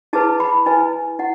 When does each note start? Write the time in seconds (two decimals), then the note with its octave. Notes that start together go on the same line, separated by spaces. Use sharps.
0.13 E4 G#4 B4 A5
0.40 B5
0.66 E4 B4 G#5
1.19 E4 F#5